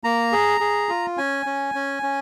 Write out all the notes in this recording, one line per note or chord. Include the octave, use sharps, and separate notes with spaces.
A#3 A#5
G#4
G#4
F4
C#4 G#5
C#4
C#4
C#4